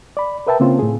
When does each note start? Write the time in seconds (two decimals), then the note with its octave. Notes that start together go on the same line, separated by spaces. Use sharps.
0.17 D5 B5
0.47 A#4 B4 E5 G5 A5
0.60 C#3 A#3 C4 C#4 F4 C5
0.79 A2 G#4